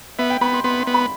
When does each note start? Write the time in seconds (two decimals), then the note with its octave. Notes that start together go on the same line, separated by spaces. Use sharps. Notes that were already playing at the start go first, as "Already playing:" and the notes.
0.18 B3 E5
0.30 G5
0.41 B3 B5
0.53 C6
0.64 B3 C6
0.80 C6
0.87 B3
0.94 B5